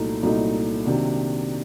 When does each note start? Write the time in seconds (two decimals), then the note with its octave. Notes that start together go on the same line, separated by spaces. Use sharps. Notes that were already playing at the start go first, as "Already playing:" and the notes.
Already playing: C2 A#2 F#3 A3 D#4
0.23 C2 A#2 F#3 A3 D#4
0.86 C3 D#3 F#3 A#3 D4